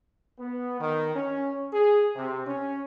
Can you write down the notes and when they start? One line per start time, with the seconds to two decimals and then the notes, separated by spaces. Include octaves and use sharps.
0.39 B3
0.80 D#3
1.15 C#4
1.73 G#4
2.16 C3
2.46 C#4